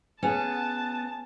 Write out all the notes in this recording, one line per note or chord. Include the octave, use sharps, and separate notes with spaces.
B3 C#4 G#4 F#5 A5